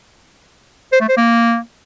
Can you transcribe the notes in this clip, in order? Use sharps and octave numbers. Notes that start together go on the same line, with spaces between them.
C5
A3
C5
A#3